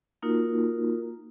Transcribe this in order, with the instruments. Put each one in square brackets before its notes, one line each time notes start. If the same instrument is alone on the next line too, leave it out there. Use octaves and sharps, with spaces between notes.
[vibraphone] A#3 D#4 F4 F#4 A#4